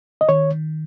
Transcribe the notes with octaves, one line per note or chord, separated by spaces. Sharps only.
D#5
D#3 C#5